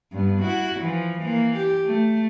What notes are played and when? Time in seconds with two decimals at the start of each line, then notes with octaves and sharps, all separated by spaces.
0.12 G2 B3
0.41 E4 F#4
0.80 E3 F3
1.18 E3 A#3
1.57 G4
1.85 A3